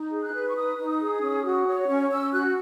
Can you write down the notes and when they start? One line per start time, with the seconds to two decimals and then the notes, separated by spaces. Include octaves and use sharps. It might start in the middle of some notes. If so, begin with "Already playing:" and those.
Already playing: D#4
0.11 G#4
0.22 F#6
0.32 B4
0.47 C#6
0.54 D#4 D#6
0.77 D#4
0.99 G#4
1.22 C#4
1.44 F#4
1.66 C#5
1.88 C#4 C#6
2.10 C#4 E6
2.32 F#4 F#6